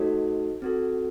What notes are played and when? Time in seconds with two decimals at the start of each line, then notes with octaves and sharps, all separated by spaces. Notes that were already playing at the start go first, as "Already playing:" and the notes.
Already playing: A3 D#4 F#4 A4 C5
0.62 C4 F#4 A4